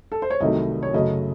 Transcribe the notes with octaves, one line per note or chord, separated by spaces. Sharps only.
A4
C5
C#5
C2 C3 D#3 F#3 A3 D#5
C#5
F#2 C#3 F#3 A3 D#5